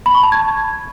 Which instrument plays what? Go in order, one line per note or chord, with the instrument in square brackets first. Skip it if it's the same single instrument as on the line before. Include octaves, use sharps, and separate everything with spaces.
[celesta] B5
C#6
A5
G#6